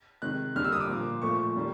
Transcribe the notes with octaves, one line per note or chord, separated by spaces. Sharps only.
C3 D#3 G#3 F#6
D3 G3 A#3 F6
E6
D#6
D6
A#2 F3 A#3
A#2 F3 A3 C#6
D#3 G3 A#3